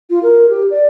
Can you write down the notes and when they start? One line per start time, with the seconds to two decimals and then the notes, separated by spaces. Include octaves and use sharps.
0.10 F4
0.23 A#4
0.49 G4
0.71 D5